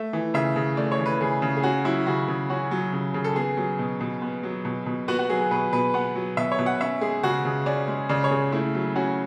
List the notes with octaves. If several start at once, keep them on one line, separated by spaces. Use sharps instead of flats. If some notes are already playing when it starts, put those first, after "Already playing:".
Already playing: A3 E5
E3
C#3 E5
C#3
A3 D5
C#5
E3
B4
C#3 G#4
C#3
G#4
C#4 F#4
F#3 E4
C#3 F#4
C#3
C#4 F#4
F#3
C#3
C#3
A4
B3 G#4
F#3
B2
B2
B3
F#3
B2
B2
B3 F#4
F#4
F#3 G#4
G#4
B2 B4
B2 B4
B3 F#5
F#3
B2 E5
C#5
B2
F#5
C#4 E5
G#3 G#4
C#3 F#4
C#3
C#4 D5
G#3
C#3 D5
C#5
C#3
A3 E4
F#3
C#4 F#4